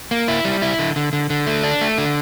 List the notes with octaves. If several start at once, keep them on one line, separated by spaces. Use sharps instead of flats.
A#3
E4
G3
E4
D3
D3
D3
D3
A3
D4
A3
D3